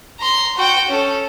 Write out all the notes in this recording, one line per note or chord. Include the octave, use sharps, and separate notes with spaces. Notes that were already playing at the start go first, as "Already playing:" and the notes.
A#5 C6
F#4 G5
C#4 A4